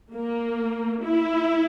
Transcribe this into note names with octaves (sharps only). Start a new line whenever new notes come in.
A#3
E4